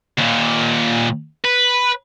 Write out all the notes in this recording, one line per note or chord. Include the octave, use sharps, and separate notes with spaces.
D#2 A#2
B4